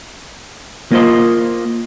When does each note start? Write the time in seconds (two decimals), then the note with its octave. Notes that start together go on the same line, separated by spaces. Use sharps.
0.92 A#3 F4 C5 D#5